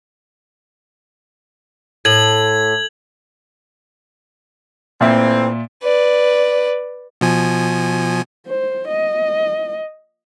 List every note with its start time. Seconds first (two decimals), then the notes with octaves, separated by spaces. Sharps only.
2.05 A2 G#6 F#7
5.01 A#2 E3 A3 C4 E5
5.82 B4 D5
7.21 B2 F3 G#5
8.47 C5
8.88 D#5